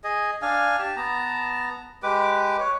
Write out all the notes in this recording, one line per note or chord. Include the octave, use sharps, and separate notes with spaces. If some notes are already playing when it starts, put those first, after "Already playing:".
G#4 D#5
D4 F5 G#5
G4 A5
B3 A5 A#5
G#3 G4 B4 D6
C#5